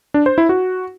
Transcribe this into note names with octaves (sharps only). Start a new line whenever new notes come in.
D4
C5
E4
F#4